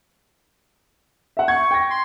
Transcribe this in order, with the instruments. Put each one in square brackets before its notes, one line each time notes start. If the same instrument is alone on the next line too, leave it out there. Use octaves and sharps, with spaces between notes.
[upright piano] E5 F#5
[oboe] C#6 [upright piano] G#6
[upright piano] G5 A#6
[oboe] C6